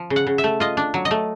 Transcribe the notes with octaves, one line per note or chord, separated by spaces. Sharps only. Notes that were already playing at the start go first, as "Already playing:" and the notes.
Already playing: F3
C#3
F#5
C#3
E5
A3
F4 D#5
D4
F#3
D#5
A3